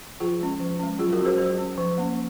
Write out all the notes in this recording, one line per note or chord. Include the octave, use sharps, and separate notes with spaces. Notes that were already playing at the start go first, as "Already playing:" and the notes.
F3 F4 G#4
G#3 C#4
F3
G#3 C#4
F#3 F4 G#4
F#4 A#4
C#4
G#4 C5
F#3 G#4 C5
C#4
F3
A#3 C#4